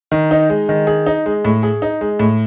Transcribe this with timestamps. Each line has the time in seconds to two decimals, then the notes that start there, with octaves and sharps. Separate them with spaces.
0.12 D#3
0.31 D#4
0.50 G#3
0.69 D#3
0.87 G#4
1.06 D#4
1.26 G#3
1.45 A2
1.63 G#4
1.82 D#4
2.01 G#3
2.19 A2